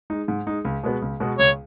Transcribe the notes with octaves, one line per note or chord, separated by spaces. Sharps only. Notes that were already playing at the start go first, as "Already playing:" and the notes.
G#3 D#4
G#2
G#3 D#4
C#2
B2 G#3 B3 F#4
C#2
B2 G#3 B3 F#4
C#2 C#5